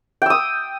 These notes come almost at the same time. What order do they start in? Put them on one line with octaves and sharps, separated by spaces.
G5 E6 D#6